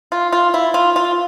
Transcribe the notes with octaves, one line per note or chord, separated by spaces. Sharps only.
F4
F4
E4
F4
F4